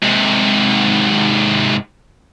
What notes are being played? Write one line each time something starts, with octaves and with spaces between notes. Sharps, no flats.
G#2 C3